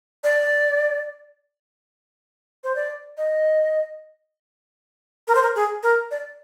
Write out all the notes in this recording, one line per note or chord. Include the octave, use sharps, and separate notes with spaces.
D5
C5
D5
D#5
A#4
C5
A#4
G#4
A#4
D5